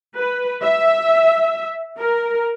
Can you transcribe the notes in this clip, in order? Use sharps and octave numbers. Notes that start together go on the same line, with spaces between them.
B4
E5
A#4